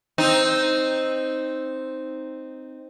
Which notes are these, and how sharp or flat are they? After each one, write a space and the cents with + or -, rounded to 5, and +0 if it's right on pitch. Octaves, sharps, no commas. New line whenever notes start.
C4 +0 D#4 +0